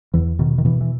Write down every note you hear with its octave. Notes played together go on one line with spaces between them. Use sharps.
E2 E3
B2 D#3
D#3
B2 E3
E3